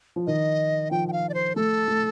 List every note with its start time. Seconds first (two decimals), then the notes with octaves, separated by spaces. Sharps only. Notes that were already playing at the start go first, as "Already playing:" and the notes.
0.16 F3
0.27 D#3 D#5
0.91 F3 G5
1.08 G5
1.13 F5
1.29 D5
1.34 C5
1.56 A3 A4
1.88 A3